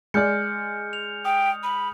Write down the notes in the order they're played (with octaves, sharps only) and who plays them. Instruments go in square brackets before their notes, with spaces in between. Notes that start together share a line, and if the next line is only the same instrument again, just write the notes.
[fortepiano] G#3 D5 [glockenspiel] F6 G6 C#7
[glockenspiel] F7
[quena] G5 [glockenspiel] D#6
[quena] B5